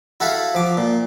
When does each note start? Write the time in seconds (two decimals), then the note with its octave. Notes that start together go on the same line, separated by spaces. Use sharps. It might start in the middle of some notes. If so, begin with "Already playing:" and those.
0.20 E4 F#4 A4 E5 F5
0.55 F3 D6
0.77 A#2